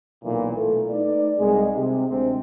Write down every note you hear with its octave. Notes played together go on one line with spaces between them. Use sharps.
B1 A#2 E3
A3
A3 D#4 B4 D5
C2 G#3
C3
D2 G#3 C4